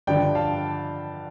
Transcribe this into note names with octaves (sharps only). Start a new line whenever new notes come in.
G2 D3 F3 D5 G5
F5 A5